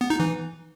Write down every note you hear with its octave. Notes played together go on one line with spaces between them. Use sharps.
B3
D#4
E3